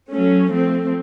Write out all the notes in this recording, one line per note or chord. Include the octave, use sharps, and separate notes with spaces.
F#3 A3 C#4
F3 A3 C4